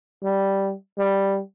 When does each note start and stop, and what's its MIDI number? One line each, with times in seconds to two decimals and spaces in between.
0.23 0.72 55
0.98 1.39 55